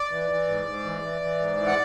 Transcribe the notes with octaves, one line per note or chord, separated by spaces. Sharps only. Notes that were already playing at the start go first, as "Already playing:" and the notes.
Already playing: D5
E3
E3
G#2
G#2
E3
E3
E3
G#2
E3
F#5